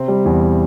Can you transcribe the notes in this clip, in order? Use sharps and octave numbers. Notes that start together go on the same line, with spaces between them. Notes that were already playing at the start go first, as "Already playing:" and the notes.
Already playing: C3 C4
G3
E2